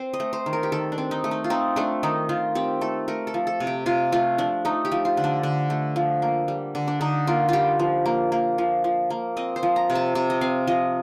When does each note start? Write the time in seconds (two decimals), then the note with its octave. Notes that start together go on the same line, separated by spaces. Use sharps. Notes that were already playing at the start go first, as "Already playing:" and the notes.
Already playing: C4 C5
0.13 D#5
0.20 A3
0.33 C5
0.46 D#3
0.53 A#4
0.63 G4
0.72 D#3 A4
0.92 D4
0.98 C4
1.11 D#4
1.24 A3
1.31 D#4
1.44 F4
1.50 C4 D#4
1.76 A3 D4
2.03 D#3 D#4
2.29 D#3 F4
2.55 C4 G4
2.81 A3 A4
3.08 A3 A#4
3.27 A4
3.34 F3
3.47 A4
3.60 C3
3.67 G4
3.86 C3 F4
4.12 A3 F4
4.38 F3 D4
4.65 A3 D#4
4.85 G4
4.92 F3
5.05 F4
5.17 D3
5.24 D4
5.43 D3
5.70 A3
5.96 F3
6.22 A#3
6.48 G3
6.75 D3
6.87 D4
7.01 D3 D#4
7.27 A#3 F4
7.49 G3 F4 G4
7.80 F3
8.06 A#3
8.32 A#3
8.58 F3
8.84 F3
9.10 A#3
9.37 C4 D#5
9.56 C5
9.63 F3
9.76 A#5
9.90 C3
9.95 A5
10.15 C3 A5
10.30 D#5
10.41 C4 F5
10.67 F3 D#5